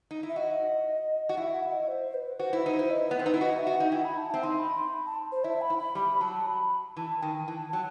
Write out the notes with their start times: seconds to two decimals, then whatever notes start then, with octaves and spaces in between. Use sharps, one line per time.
0.11 D#4
0.23 E4
0.29 E5
0.36 F#4 D#5
1.29 F#4
1.37 E4 E5
1.54 F#5
1.71 D#5
1.88 C5
2.14 B4
2.39 F#4 C5
2.53 E4 B4
2.66 D#4
2.74 C5
2.79 E4
2.90 D#5
3.08 B3 B4
3.19 C4
3.24 D#4 B4
3.34 E4
3.41 F#4 D#5
3.59 E5
3.67 F#4
3.74 F#5
3.80 D#4
3.91 E4 G5
4.05 B5
4.18 A5
4.31 C4 E5
4.43 D#4 C6
4.59 B5
4.77 C6
4.93 B5
5.06 A5
5.32 C5
5.44 E4 E5
5.61 B5
5.70 E4
5.78 B5
5.95 G3 B5
6.21 F#3 A5
6.47 B5
6.97 E3 A5
7.22 D#3 G5
7.48 E3 A5
7.73 F#3 A5